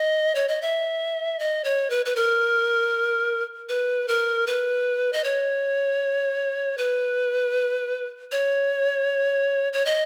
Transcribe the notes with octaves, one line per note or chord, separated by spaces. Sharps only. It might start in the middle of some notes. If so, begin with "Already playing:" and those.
Already playing: D#5
C#5
D#5
E5
D#5
C#5
B4
B4
A#4
B4
A#4
B4
D#5
C#5
B4
C#5
C#5
D#5